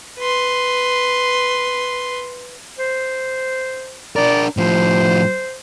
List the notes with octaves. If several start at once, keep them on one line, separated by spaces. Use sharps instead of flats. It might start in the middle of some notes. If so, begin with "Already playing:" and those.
B4 C6
C5
D4 A#4 D5
A2 F3 C5